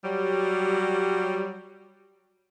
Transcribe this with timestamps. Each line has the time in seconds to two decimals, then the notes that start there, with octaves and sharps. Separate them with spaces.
0.04 F#3 G3